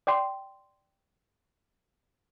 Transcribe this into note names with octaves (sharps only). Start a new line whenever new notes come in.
D5 G5 C6